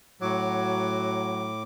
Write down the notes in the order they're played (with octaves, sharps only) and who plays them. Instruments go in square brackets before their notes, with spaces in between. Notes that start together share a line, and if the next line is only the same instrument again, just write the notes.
[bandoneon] A2 D6 [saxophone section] F#3